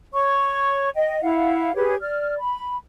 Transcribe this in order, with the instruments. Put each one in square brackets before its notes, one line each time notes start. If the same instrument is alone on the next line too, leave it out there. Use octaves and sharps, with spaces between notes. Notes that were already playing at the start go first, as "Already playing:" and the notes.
[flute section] C#5 C#6
D#5 G5
E4 F5 F#5
G4 G#4 B4 C#5
D5 F6
B5